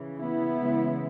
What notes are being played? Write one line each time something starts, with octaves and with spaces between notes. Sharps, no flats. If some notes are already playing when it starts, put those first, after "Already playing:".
Already playing: C#3 E3
B3 E4
C#3 E3 G#3